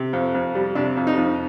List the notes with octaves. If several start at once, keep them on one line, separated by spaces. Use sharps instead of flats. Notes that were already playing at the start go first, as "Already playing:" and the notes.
Already playing: C3
F2
F2
G3
C3 D4
F2
D#4
F2